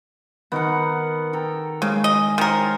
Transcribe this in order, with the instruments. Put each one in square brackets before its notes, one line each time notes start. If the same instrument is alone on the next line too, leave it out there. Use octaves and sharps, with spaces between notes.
[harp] D#3 [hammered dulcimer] B3 A#4 F#5
[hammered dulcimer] A4 G5 A#5
[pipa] C#3 [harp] G#3
[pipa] D#5 [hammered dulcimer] G#5
[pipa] D#3 A#4 [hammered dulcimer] C5 C#5 F5